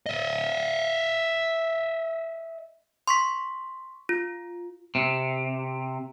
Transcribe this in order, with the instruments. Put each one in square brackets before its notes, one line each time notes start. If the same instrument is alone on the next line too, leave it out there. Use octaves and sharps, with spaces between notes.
[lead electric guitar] D#5 E5
[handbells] C6 C#6 B6
F4
[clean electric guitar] C3